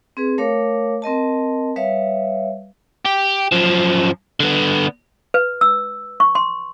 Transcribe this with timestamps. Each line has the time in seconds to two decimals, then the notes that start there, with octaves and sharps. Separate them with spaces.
0.17 C4 G#4 B4
0.38 A3 A#4 C#5 F5 D6
1.02 C4 A#4 D#5 A5
1.76 G3 B4 C#5 E5 F5
3.06 G4
3.52 F#2 F3
4.40 D3 B3
5.34 B4
5.61 E6
6.20 C#6
6.35 C6